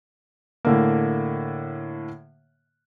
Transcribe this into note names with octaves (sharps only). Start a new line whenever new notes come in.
A2 D3 A#3